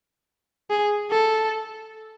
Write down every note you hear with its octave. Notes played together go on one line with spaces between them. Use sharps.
G#4
A4